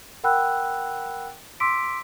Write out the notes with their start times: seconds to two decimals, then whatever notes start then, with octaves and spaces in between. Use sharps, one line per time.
0.24 A#4 F#5 G5 B5 E6 F#6
1.60 C6 D6 E6 B6 D7